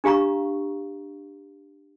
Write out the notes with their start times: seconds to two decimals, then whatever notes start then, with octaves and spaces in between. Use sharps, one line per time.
0.04 D4 G4 F5 A#5 C#6